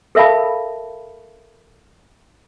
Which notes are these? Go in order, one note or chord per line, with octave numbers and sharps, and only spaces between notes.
A4 A#4 E5 F5 A5 B5